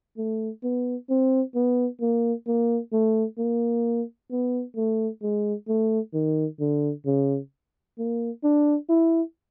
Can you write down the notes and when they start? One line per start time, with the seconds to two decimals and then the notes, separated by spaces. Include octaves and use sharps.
0.18 A3
0.64 B3
1.10 C4
1.55 B3
2.01 A#3
2.47 A#3
2.92 A3
3.38 A#3
4.31 B3
4.76 A3
5.22 G#3
5.68 A3
6.14 D#3
6.60 D3
7.06 C#3
7.98 A#3
8.44 D4
8.90 E4